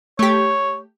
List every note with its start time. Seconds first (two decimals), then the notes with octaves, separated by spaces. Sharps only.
0.19 A3 G4 C#5